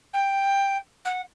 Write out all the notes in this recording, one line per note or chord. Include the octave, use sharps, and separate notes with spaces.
G5
F#5